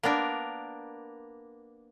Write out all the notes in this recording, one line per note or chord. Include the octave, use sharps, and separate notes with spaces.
A#3 B3 D4 A#4